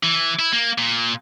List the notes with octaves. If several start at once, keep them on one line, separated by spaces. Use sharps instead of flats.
E3
E4
A#3
A#2